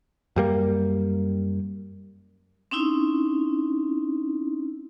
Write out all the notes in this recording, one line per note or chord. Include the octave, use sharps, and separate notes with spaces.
F#2 G3 A#3
C4 C#4 D#4 E4